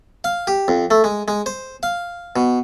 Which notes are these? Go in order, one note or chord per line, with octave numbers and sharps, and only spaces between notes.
F5
G4
F2
A3
G#3
G#3
C5
F5
B2